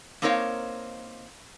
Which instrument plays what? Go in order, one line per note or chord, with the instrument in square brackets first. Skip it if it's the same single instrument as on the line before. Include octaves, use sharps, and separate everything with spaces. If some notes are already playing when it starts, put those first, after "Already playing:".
[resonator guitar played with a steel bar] A#3 C4 D#4 A#4 C#5 F5